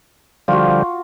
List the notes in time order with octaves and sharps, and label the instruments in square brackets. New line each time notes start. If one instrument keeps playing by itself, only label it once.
[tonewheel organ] D3 F3 G3 [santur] F4 F#4